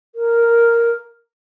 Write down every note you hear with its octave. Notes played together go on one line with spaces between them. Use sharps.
A#4